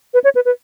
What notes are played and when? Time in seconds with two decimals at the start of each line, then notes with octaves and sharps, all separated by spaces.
0.14 B4
0.24 C#5
0.35 B4
0.45 B4